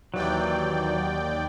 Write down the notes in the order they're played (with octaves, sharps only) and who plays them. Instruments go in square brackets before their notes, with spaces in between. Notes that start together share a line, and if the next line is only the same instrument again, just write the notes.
[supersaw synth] D#2 D5 G5 [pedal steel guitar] E3 F#3